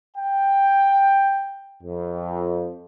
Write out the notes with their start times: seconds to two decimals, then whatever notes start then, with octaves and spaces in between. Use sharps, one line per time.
0.17 G5
1.82 F2